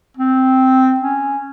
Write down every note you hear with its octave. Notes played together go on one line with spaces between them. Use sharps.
C4
C#4